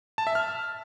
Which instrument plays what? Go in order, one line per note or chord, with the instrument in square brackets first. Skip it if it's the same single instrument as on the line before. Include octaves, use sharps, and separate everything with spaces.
[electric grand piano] A5
E5
F6